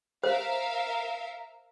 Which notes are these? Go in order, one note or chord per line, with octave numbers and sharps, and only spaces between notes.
A#4 C5 E5 F5